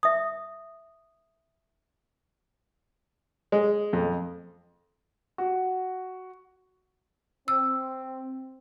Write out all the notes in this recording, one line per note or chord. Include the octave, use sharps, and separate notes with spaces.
E5 D#6
G#3
F2
F#4
C4 E6